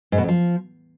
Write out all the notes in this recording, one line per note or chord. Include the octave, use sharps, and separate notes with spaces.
G#2
B2
F2
F3